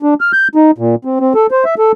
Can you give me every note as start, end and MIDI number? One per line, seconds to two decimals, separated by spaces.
0.03 0.14 62
0.21 0.32 89
0.33 0.48 91
0.55 0.71 63
0.78 0.95 46
1.05 1.20 60
1.20 1.33 60
1.35 1.47 69
1.51 1.64 72
1.65 1.75 76
1.78 1.92 69